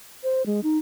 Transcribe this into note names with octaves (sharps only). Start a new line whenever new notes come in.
C5
G#3
D#4